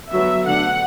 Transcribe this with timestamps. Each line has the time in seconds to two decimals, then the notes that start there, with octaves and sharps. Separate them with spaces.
0.11 D3 F#3 B3 E5
0.45 D3 A3 D4 F#5